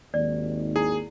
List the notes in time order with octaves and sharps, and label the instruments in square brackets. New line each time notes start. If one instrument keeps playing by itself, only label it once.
[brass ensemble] G#1 D#2 [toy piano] D5
[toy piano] E4 [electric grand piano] G#4